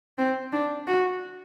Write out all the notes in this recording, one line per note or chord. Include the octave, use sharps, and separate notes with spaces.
C4
D4
F#4